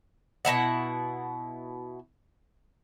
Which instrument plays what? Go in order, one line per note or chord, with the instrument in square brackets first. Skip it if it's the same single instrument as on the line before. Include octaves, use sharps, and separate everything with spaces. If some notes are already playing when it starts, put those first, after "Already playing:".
[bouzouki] B2 B3 E4 F#5